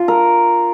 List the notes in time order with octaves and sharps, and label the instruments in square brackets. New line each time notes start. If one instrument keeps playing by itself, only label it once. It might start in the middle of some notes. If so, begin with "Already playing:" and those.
Already playing: [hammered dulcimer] F4
A#4